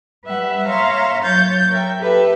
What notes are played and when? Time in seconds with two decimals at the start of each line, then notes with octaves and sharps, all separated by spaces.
0.24 G3 B4 E5 F#5
0.67 C#5 E5 F5 A#5 C6
1.23 F#3 C#5 G6 A6
1.71 A#4 E5 G5
1.99 G4 A4 B4 E5